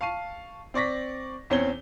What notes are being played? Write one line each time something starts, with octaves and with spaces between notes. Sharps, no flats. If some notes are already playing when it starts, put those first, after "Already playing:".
F5 A5 C#6 C7 D#7
C4 D5 C#6 A#6 B6
E2 C4 C#4 C#5 G7